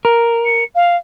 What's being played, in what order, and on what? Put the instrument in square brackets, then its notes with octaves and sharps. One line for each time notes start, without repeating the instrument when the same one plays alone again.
[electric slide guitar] A#4
[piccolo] C#7
F5